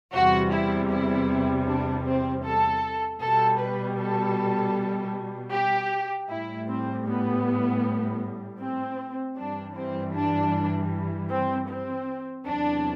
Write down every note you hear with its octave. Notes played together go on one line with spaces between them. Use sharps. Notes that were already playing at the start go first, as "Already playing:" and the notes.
E2 C3 G3 F#4
E4
E4
D4
C4
A4
B2 G3 A4
B4
A4
G4
A2 G3 E4
C4
B3
C4
G2 E3 G3 D4
C4
D4
C4
C4
E2 C3 F#3 D4